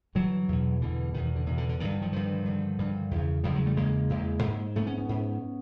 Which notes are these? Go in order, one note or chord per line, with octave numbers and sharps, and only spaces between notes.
G2 D3 E3 F#3
E2 B2
E2 B2 D3 E3
E2 B2 D#3
D#3
D3
E2 B2 D#3
D3
D3
D3 D#3
G2
D#3
D#3 F3
G2 D3 D#3 F3
G2 D3
G2 D3
E2 C#3
E2 C#3 F3 G3
F#3 G#3
G3 A3
E2 C#3 G#3 A#3
E2 C#3
G#2
G#2 A3 B3
B3 C#4
B3 C#4
G#2